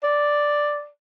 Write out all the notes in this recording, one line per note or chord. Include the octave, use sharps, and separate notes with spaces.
D5